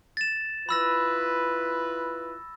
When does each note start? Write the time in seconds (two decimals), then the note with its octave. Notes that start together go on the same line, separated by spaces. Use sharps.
0.17 A6 E7
0.69 E4 F4 B4 B5 E6 A#6